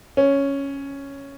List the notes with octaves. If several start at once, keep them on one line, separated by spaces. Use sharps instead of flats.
C#4